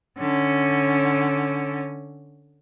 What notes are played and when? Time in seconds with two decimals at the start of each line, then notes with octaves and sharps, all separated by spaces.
0.19 D3 C#4